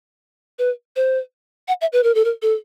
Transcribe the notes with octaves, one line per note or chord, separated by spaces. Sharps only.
B4
C5
F#5
E5
B4
A#4
A4
A#4
A4